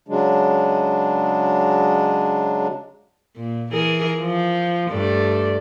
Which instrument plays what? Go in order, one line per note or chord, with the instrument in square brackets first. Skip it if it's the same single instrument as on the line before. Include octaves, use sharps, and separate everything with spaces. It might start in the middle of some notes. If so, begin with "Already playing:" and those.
[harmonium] C#3 F#3 G#3 D4
[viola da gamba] A#2
E3 G#4 A#4
F3
G2 A3 D5